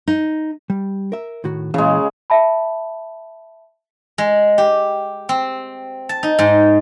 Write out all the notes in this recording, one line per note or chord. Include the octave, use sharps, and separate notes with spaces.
D#4
G3
A#4 E5
A2 D#3 F#4
A#2 C#3 E3 G#3
E5 A5 B5
G#3
G4
C4
A5
D#4
G#2